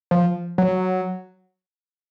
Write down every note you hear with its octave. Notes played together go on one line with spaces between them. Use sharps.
F3
F#3